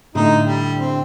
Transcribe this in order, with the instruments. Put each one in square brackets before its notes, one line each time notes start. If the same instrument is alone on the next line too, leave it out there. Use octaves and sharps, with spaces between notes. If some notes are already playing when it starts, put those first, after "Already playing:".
[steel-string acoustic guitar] A2 D3 [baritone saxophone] D#4
[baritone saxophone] G3
C4